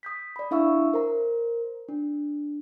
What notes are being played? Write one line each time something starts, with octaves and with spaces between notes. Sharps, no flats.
D#6 G6 B6
D5 B5
D4 E4 E5 F5 C#6 E6
A#4 C5 A#5
D4